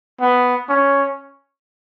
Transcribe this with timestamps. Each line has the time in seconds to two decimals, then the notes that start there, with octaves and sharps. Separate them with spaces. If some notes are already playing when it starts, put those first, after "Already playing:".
0.21 B3
0.69 C#4